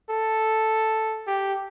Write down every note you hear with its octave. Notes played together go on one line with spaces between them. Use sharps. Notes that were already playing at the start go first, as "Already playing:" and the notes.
A4
G4